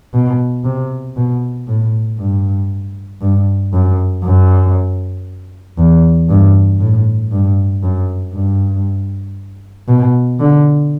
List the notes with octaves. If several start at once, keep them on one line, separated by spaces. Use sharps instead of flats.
B2
C3
B2
A2
G2
G2
F#2
F#2
E2
G2
A2
G2
F#2
G2
B2
D3